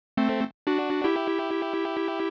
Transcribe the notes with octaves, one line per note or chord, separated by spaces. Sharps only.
A3 C4
D4 F#4
E4 G4